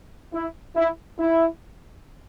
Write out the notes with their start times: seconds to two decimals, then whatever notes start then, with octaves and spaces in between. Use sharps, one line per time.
0.33 E4
0.76 E4
1.19 E4